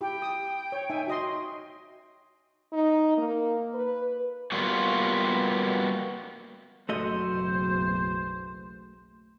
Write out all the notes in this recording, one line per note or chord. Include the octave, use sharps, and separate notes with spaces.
E4 G4 G5
D#6
C#5
D#4 E5 G#5
F#4 D#5 C6
D#4
A#3
B4
G3 A#3 B3 F4 F#4
F#1 B1 E3 A3 F#4 C5 D#5